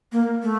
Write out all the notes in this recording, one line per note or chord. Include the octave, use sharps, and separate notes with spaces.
A#3
A3